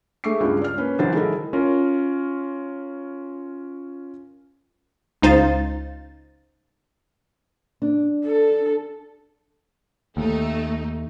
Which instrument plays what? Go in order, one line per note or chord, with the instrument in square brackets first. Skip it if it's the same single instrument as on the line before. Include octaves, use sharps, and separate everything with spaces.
[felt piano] G#3 A3 E5 C#6 D6 C7
C#2 G2 G#3
D5 F6
A#3 C#4 B4
A#1 E3 F#3 A#4 C5 A6
D#3 G#3 E4 A4 A#4 D#5
[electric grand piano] C#4 F4 A#4
[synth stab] C#2 D#4 C5 F5 A6
[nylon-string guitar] D4
[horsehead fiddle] A4
[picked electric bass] D#2 [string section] A3 D#4